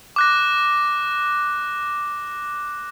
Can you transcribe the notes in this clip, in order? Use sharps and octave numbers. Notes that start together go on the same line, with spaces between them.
D6 F#6 A#6